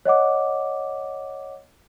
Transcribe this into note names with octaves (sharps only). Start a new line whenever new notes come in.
C#5 D#5 F#5 D6